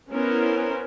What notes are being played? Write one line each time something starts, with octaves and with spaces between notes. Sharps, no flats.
B3 C#4 E4 A#4 C5